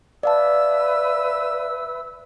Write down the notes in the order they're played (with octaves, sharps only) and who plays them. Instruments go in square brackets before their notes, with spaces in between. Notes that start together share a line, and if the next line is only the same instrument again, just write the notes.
[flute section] B4 E5 E6 [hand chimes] D5 F5 A5